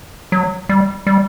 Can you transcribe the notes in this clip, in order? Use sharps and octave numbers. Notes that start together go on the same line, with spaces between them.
F#3
G3
G3